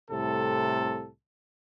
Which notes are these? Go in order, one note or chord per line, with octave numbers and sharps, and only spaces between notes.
C2 A2 C3 A4